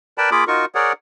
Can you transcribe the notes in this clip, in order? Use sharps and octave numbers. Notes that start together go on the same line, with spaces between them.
A#4 B4 D5 G5 A5 B5
A#3 F4 G#4 B5 D6
D#4 F4 F#4 A#4 C#6
G#4 A#4 C#5 D5 F#5